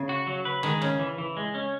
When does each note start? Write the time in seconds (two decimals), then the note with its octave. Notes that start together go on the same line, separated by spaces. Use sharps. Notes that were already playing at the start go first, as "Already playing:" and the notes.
Already playing: C#3
0.09 F#4
0.27 F#3
0.45 B4
0.63 D#3 G#3
0.82 C#3 C#4
0.99 E3
1.18 E3
1.37 G#3
1.55 C#4